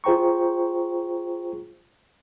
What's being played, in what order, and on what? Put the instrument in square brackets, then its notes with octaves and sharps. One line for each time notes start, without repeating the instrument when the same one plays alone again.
[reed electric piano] F4 G#4 C5 G5 A#5 C#6